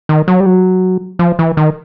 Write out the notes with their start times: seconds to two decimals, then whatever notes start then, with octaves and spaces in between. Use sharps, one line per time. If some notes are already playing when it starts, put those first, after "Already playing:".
0.09 D#3
0.28 F#3
0.40 G3
0.46 F#3
1.19 F3
1.39 E3
1.57 D#3